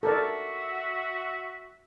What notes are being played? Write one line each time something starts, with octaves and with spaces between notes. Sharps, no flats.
F#4 A4 A#4 D5 E5